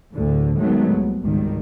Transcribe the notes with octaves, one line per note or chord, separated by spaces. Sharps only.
D2 A2 D3
D#3 F#3 G#3 A3 B3
C2
G#1 C#2 D#3 G3